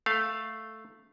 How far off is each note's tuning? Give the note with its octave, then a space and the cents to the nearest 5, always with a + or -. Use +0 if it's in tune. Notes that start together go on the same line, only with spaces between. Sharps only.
A3 +0 F5 +0